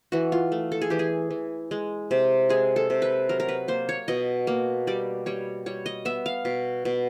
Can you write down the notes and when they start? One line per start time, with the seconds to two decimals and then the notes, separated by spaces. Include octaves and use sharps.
0.12 E3 F#4
0.32 F4
0.52 A3
0.72 A4
0.82 G#4
0.90 E3 G4
0.99 G#4
1.31 E3
1.71 G#3
2.11 C3
2.49 G#3 G#4
2.76 A4
2.90 C3
3.02 B4
3.29 F#3 A#4
3.40 A#4
3.49 B4
3.68 A#3 C5
3.89 C#5
4.08 B2 D#5
4.47 A#3
4.87 G3 D5
5.26 G3 C#5
5.66 G3 C#5
5.86 D#5
6.05 B3 E5
6.26 F5
6.45 B2
6.85 B2